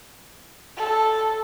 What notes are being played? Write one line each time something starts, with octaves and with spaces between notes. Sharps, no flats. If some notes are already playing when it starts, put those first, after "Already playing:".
A4